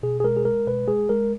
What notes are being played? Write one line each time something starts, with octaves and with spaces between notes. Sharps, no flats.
B2 G#4
G#4
G#3 A#4
G#4
G#3 A#4
B2 B4
G#3 G#4
G#3 A#4